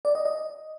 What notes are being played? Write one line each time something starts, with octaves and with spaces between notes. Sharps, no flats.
D5
D#5
D#5